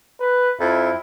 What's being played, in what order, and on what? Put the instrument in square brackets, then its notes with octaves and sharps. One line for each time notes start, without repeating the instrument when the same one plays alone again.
[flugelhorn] B4
[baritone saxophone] F2 [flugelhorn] E4